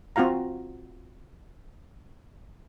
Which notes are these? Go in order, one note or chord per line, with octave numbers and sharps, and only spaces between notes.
C4 F4 F#4 F5 A#5